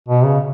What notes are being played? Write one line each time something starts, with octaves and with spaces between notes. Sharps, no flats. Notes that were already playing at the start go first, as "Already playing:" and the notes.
B2
C#3